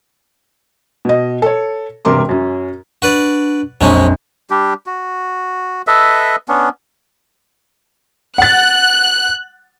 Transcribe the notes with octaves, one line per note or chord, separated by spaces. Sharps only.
B2 D#5
A4 C#5
E1 G2 C3 A#4 C6 D6
F#2 C#4
D4 F#4 B4 D5
A#1 F2 F#3 G#3 C#4 C5
G3 D4 G4
F#4
A4 B4 D#5 E5
B3 C#4 D4
F#5 F#6 A6